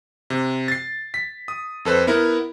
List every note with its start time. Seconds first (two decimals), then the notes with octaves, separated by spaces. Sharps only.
0.30 C3
0.68 A6 C7
1.14 B6
1.48 D#6
1.85 F2 A4 B4 C5
2.07 B3 E4 A#4